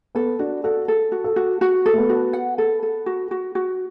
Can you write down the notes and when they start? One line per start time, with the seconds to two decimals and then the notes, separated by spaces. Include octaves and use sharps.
0.15 B3 A4
0.39 D4 F#4
0.64 F#4 A4
0.88 A4
1.12 F#4
1.24 A4
1.36 F#4
1.61 F#4
1.86 A4
1.93 A3
1.98 B3
2.09 F#4
2.33 F#5
2.58 A4
2.83 A4
3.06 F#4
3.31 F#4
3.55 F#4